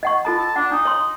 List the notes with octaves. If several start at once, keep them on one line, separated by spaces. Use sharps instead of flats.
D#5 F#5 C#6
F4 A4 A5 A#5
A5
D4 F#5
D4 D#4
C#5 C6